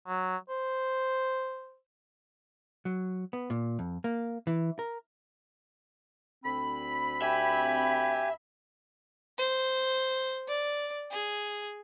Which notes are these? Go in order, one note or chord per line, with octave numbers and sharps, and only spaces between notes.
F#3
C5
F#3
B3
A#2
F2
A#3
E3
A#4
D2 C4 B5
G4 E5 G#5
C5
D5
G#4